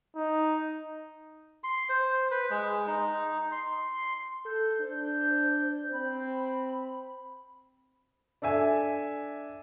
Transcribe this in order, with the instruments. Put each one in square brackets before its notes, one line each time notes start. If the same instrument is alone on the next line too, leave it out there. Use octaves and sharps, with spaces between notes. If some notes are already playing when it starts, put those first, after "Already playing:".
[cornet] D#4
[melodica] C6
C5
B4
G#3
D#4
C6
[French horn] A4 [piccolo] G6
[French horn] D4 [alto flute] C5
[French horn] C4 [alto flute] B5
[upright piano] D4 A4 E5 G#5